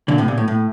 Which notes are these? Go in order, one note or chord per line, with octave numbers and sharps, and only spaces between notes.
A#2 D3
A2 C3
A#2
A2
A2